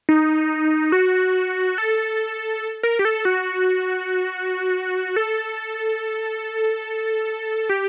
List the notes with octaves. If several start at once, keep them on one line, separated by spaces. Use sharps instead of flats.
D#4
F#4
A4
A#4
G4
A4
F#4
A4
G4